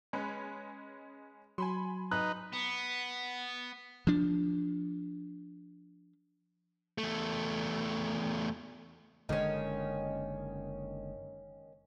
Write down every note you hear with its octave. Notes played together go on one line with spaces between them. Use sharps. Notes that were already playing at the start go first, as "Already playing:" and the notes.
G#3 C#4 B4
F#3 G#5 B5 C6
D#4 B4 F#6
B3
F3 D4
E2 A3
F#1 D3 D#3 G#3 C#4